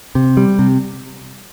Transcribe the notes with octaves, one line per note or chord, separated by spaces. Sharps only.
C3
G3
C3